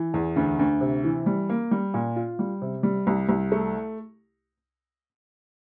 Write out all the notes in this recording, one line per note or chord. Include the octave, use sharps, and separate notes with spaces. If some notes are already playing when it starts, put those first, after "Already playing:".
Already playing: E3
E2
D2
D2
C3
E3
G3
A#3
G3
A#2
F4
G3
C3
G3
C2
C2
A3